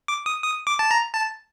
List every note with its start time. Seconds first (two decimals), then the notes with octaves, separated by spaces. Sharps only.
0.08 D6
0.26 D#6
0.43 D#6
0.67 D6
0.79 A5
0.91 A#5
1.15 A5